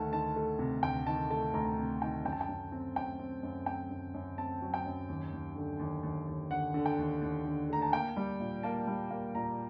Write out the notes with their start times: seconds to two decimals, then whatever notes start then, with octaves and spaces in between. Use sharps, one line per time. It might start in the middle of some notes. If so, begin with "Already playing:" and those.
Already playing: D2 D#3 A3 A5
0.12 D#3 A5
0.36 A3
0.59 C3
0.83 D2 G5
1.07 D#3 A5
1.30 A3 A5
1.54 D2 A#5
1.78 C3
2.02 D#3 G5
2.25 F#2 G5
2.32 A5
2.41 G5
2.48 F#2
2.72 C4
2.96 F#2 G5
3.19 C4
3.43 F#2
3.66 C4 G5
3.91 F#2
4.14 F#2
4.38 C4 A5
4.62 F#3
4.74 G5
4.86 F#2
5.08 D#2
5.32 D#2
5.56 D3
5.79 D#2
6.03 D#2
6.27 D#2
6.50 D3 F#5
6.74 D3
6.86 G5
6.98 D#2
7.21 D#2
7.45 D3
7.69 A3 A#5
7.82 A5
7.92 A#3 G5
8.17 G3
8.40 A#2
8.63 A#3 A5
8.87 G3
9.10 A#3
9.35 A#2 A#5